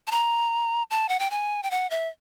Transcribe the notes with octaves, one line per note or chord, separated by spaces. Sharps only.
A5
A#5
A5
F#5
G5
G#5
G5
F#5
E5